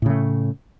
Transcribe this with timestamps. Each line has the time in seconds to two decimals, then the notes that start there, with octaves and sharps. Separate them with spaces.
0.02 A2
0.06 C#3
0.10 A3